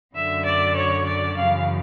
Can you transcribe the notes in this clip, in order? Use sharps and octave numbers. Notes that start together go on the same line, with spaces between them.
F#2 D3 E5
D5
C#5
D5
F#2 C#3 E3 F5